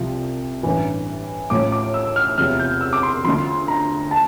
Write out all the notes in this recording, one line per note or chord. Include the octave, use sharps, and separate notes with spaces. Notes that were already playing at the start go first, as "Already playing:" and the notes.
Already playing: C2 C3 F3
A1 G2 E3
A1 A2 F3 D6
D6
E6
F6
E2 C3 F3 F6
G6
E6
D6
C6
D2 D3 F3 C6
A#5
A5